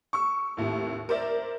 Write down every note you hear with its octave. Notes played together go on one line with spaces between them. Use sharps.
C#6 E6
D#2 A2 C3
A#4 C5 D5 E5